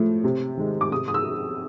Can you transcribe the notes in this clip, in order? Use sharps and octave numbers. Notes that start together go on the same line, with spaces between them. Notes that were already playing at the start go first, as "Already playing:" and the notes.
Already playing: A2 F3 A3
C3
D#3 G#3
D6
C3 D#6
D#6
E6